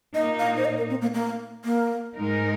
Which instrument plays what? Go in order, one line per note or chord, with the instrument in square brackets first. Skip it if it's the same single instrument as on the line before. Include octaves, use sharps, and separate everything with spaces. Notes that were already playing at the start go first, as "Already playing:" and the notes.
[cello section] A#2 A#3 D#4 [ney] D#5
[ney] F5
C5
D#5
A#4
C4
A#3
A#3
A#3
[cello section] G#2 G#3 D#4 A#4